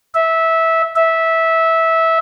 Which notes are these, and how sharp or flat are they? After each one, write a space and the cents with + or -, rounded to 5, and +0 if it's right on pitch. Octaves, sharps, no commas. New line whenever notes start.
E5 -15
E5 -15